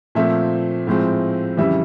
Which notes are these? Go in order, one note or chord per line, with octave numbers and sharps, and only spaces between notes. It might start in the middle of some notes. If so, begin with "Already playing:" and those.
A#2 F3 A3 C4 E5
A2 F3 G#3 C4
F2 C#3 E3 G3 E5